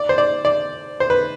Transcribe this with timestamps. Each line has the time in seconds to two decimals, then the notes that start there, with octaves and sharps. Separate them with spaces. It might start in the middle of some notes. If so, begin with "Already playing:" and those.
Already playing: D5
0.09 C5
0.18 D5
0.45 D5
1.00 C5
1.10 B4